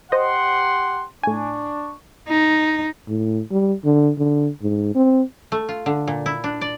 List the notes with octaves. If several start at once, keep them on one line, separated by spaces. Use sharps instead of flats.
G4 C5 D#5 F#5 C6
A2 D4 G#5 C#6
D#4
A2
G3
D3
D3
G#2
C4
A3
F4
D3
A#2
E4
D4
D5